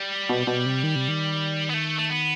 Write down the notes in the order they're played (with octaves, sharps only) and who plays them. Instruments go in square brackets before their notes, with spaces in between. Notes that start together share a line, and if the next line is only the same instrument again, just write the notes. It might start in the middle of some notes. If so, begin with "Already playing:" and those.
Already playing: [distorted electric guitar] G3
[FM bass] B2
B2
C3
D#3
C3
D#3
[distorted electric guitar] B3
A3
A3
B3